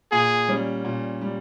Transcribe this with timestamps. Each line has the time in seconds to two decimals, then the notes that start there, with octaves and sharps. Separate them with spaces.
0.12 A#2 G#4
0.48 G3 C#4
0.85 A#2
1.21 G3